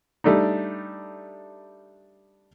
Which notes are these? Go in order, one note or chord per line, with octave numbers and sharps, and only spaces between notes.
G3 A3 D4 D#4